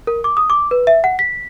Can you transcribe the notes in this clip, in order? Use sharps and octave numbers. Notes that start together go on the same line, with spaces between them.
A#4
D6
D#6
D6
B4
E5
F#5
B6